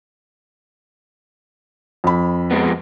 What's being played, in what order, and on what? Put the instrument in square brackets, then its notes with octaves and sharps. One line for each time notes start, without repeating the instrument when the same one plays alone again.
[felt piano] F2 B5
[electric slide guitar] F3 G#3 B3